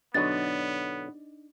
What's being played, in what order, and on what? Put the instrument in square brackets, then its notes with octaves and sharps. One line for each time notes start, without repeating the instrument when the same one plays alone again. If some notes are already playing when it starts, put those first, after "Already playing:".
[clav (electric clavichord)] B2 D3 F#3 [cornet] B3 [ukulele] D4 D#4 D#5 [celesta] A6